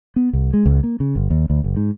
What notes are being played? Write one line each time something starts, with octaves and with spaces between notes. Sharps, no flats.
B3
C2
G#3
C#2
A#3
C#3
G1
D#2
D2
F#1
G#2